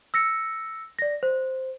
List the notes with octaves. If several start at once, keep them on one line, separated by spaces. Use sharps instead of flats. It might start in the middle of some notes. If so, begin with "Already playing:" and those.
E6 A#6 C#7
D5 A#6
C5